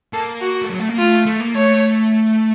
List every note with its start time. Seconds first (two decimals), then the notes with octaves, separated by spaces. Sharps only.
0.13 A#3 A4
0.41 F#4
0.62 A3
0.69 F#3
0.79 A3
0.89 A#3
0.98 A3 F4
1.26 A3
1.40 A#3
1.54 A3 C#5